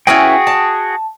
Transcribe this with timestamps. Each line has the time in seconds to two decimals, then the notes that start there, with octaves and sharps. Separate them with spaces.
0.07 C#4 E4 F#4 G#4 B4 G5
0.47 A5